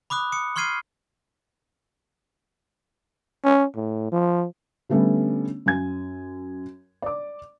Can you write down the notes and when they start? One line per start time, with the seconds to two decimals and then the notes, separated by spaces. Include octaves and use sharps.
0.10 B5 D6 D#6 F#6
0.32 D#6 C#7
0.56 C6 C#6 F6 G#6 C7 D#7
3.44 C#4
3.76 A2
4.12 F3
4.89 D3 G3 A3 B3 C#4
5.66 F#2 G#5 G#6
7.02 D5 D6